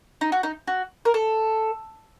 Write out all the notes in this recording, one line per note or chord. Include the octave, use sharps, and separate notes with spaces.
D#4
F#4
D#4
F#4
A#4
A4